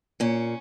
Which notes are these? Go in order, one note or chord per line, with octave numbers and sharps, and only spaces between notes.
A#2 C#4